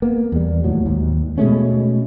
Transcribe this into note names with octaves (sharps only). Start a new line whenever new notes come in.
A#3 B3
E2 G3
D#2 A2 F#3
D#2 G#2
B2 G#3 A3 C#4